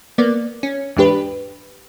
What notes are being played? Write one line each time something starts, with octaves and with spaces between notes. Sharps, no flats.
A#3 B3 D5
C#4
E2 G#2 D4 G4 B4